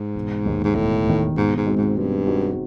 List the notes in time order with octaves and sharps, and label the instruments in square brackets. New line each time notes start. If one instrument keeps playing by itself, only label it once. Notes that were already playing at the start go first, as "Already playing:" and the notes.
Already playing: [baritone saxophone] G#2
[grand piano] E1
D#2 D#3
[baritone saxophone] G#2
[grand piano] E1 [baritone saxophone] A2
[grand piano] D#2 D#3
[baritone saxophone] G#2 [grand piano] B2
[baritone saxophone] G#2
[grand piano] G#3 C4 D#4 F#4
[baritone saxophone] G#2
[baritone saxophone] G2 [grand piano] B2
[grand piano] G#3 C4 D#4 F#4